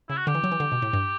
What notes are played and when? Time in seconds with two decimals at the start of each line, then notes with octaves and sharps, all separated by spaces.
0.09 C#3 E4
0.18 F#4
0.27 D3 G4
0.35 E3
0.44 F#3
0.52 E3
0.60 D3
0.72 B2
0.82 A2
0.93 G2